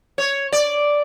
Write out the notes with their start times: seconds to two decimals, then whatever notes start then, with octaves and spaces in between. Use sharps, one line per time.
0.18 C#5
0.52 D5